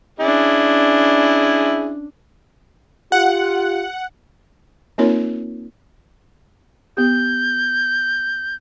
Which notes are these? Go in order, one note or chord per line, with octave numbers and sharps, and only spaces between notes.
C#4 D4 E4 G#4
F4 G4 F#5
A#3 C4 D#4 F4 A#4 C#5
B3 G4 G6